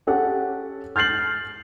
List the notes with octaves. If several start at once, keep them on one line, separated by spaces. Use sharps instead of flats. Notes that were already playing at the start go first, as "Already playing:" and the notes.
C#4 G4 A4 F#5
F6 G6 A6 C7 F#7